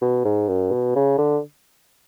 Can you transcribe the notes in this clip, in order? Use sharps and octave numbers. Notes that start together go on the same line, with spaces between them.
B2
G#2
F#2
B2
C#3
D3